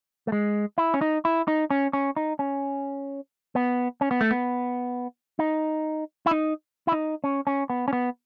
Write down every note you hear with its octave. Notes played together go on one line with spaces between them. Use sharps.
A3
G#3
E4
C#4
D#4
E4
D#4
C#4
C#4
D#4
C#4
B3
C#4
B3
A3
B3
D#4
E4
D#4
E4
D#4
C#4
C#4
B3
C#4
B3